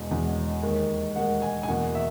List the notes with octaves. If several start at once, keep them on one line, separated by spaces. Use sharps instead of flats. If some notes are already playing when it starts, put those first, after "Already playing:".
Already playing: E1 E2 B2 G#3
E1 E2 B2 G#3
D#2 D#3 G#3
D#2 D#3 G#3 F#5
G#5
G#5
E2 B2 A#3 F#5
E5